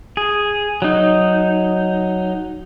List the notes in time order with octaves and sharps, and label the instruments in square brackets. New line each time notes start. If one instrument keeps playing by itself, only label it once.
[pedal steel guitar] G#4
F#3 D#4